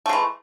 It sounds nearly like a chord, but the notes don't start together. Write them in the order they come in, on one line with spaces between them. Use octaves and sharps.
A3 G#3 E3